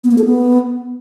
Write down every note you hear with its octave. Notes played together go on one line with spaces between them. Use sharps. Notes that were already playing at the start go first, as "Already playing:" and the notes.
B3
A#3
A4
B3